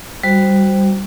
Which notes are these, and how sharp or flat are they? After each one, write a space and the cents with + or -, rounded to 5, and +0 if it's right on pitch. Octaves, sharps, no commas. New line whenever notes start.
G3 -5 F#4 +0 C5 +0